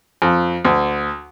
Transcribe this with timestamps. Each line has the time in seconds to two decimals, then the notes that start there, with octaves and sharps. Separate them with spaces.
0.22 F2
0.65 D2